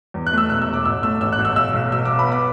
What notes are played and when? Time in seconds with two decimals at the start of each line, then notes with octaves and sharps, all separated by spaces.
0.14 E2
0.26 F#6
0.33 A3 E6
0.50 E1 F#6
0.62 E6
0.67 E1
0.74 D6
0.85 A1 E6
1.03 A3 E6
1.21 A1 E6
1.32 F#6
1.39 A1
1.45 E6
1.56 B1 E6
1.74 B1
1.91 B2 E6
2.05 B3 D6
2.19 B5
2.27 B3
2.32 D6